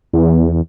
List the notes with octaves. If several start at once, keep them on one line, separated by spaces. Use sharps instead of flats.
E2